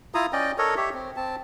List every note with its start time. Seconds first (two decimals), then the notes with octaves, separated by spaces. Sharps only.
0.14 E4 F4 A#5 D#6
0.33 C#4 D5 D#5 G5
0.58 A4 A#4 C#5 D#5
0.77 G4 C#5 E5
0.94 C4
1.16 C4 A5